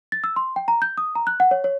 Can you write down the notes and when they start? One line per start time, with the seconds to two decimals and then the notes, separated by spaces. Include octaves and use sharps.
0.12 A6
0.24 E6
0.36 C6
0.56 G5
0.68 A#5
0.82 G6
0.98 D#6
1.15 A#5
1.27 F#6
1.40 F#5
1.51 C#5
1.64 C#5